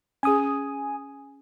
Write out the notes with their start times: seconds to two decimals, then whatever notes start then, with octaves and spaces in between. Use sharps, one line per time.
0.23 C#4 G#4 G#5 D#6